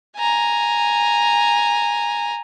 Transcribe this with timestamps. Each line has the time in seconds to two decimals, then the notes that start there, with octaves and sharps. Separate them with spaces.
0.17 G#5 A#5